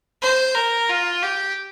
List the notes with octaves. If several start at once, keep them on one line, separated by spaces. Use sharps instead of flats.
C5
A#4
F4
G4